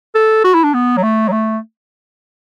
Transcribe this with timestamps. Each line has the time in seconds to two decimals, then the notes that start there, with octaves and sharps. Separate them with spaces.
0.15 A4
0.44 F#4
0.54 E4
0.64 D4
0.74 B3
0.97 F#3
1.03 A3
1.29 F#3
1.32 A3